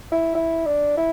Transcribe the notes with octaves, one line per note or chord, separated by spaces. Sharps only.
E4
E4
D4
E4